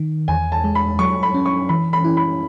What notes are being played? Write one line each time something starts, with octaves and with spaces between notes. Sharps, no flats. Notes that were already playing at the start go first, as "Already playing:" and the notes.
Already playing: D#3
E2 G#5
A5
G#3
B5
F#3 C#6
B5
C#4
C#6
E3 B5
B5
E4
B5